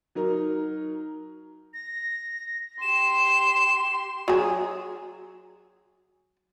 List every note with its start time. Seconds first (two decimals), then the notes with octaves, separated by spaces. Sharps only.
0.15 F#3 D#4 A#4
1.74 A#6
2.82 G4 C6 E7
4.28 F#3 G#4